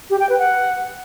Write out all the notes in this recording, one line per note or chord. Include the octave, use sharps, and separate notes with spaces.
G4
G5
B4
F#5